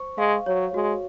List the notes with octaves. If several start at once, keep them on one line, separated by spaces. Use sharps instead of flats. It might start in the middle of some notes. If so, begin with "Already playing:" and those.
Already playing: C5 C#6
G#3 F5
F#3 C#5
G#3 F#4